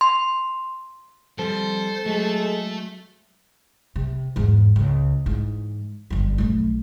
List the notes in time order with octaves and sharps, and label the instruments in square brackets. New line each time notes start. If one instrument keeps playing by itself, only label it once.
[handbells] C6
[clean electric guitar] F3 G3 C4 [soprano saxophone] A4 [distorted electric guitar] C5
[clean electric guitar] F#3 [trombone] G#3 [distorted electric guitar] A3
[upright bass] C3
E2 G#2
C#2
G#2 E3
G1 F2
B1 A3